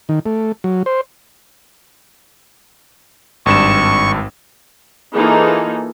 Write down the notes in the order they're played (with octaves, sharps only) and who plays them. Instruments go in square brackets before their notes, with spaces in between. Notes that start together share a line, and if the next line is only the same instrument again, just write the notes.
[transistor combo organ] D#3
A3
F#3
C5
[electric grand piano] G#1 G2 E7 [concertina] C#6
[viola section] E3 A#3 D#4 F4 G#4 A4